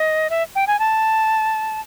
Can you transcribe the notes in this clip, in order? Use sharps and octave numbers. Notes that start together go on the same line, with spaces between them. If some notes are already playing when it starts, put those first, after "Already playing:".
Already playing: D#5
E5
G5
G#5
A5